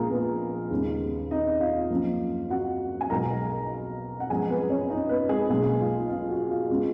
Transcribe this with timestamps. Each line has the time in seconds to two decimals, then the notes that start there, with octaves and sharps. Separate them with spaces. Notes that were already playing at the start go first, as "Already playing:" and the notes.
Already playing: A#1 A#2 G#3 A#3 F4 G#4 A#4
0.10 B3 B4
0.70 D#2 C#3 G#3 B3
1.31 D#4 D#5
1.60 F4 F5
1.90 F#2 F3 A#3
2.50 F#4 F#5
3.01 G#5
3.10 B1 B2 G#3 B3 A#4 A#5
4.20 F#5
4.30 F#2 F3 G#3 B3 G#4 G#5
4.49 B3 B4
4.70 C#4 C#5
4.90 D#4 D#5
5.09 B3 B4
5.29 G#3 G#4
5.50 B1 B2 G#3 A#3 G#4
5.80 F4
6.09 F4
6.29 F#4
6.50 F4
6.70 C#3 G#3 B3